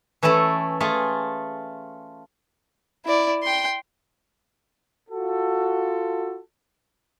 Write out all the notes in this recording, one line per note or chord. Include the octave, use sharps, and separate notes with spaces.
E3 A3 C#4 E4 A4
A3 F4 G#4 G#5
E4 D5
G5 C6
F4 F#4 A4